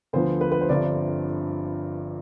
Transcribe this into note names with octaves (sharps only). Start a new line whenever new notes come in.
D2 D3 F3 B3 C5
B4
B4
C5
G1 G2 D3 F3 C4 D5